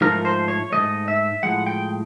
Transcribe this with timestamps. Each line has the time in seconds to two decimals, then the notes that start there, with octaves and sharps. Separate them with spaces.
0.01 G#2 F3 A3 A#4
0.25 C5
0.48 C#5
0.72 F3 A3 D#5
0.77 G#2
1.08 E5
1.43 A2 F3 G#3 F#5
1.67 G5